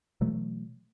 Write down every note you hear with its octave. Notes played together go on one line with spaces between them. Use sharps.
B2 E3 F#3 A3